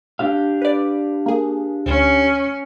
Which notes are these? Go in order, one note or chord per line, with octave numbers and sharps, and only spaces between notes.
D4 G4 F5
B4 D5
A#3 G#4
D2 C#4